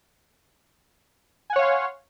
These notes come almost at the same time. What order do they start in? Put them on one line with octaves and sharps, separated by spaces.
G#5 F#5 C#5 F5 C6